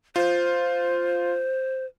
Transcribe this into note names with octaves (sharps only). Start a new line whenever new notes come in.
F4 C5